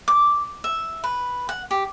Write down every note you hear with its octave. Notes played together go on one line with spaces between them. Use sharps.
D6
E5
B4
F#5
G4